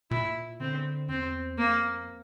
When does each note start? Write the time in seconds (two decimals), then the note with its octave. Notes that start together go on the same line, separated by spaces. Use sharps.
0.11 A#2 E4
0.60 D3 C4
1.09 E2 C4
1.58 F2 A#3